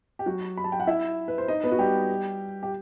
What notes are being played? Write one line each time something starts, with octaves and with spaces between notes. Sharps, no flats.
G4
F#3 F#4
B5
A5
G5
F#5
E4 E5
B4
C5
D#4 D#5
B3 B4
F#4
G3 G4
G4